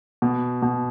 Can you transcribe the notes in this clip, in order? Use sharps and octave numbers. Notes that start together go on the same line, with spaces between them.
B2
B2